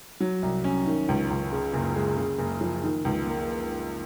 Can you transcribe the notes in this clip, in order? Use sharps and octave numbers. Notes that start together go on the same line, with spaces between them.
F#3
C2
C#4
D#3
C#2
C#2
C#3
F#1
G#3
C#3
F#1
F3
D#3
C#2
A#3